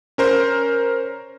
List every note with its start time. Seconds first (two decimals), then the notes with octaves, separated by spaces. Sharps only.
0.18 C#4 A#4 C5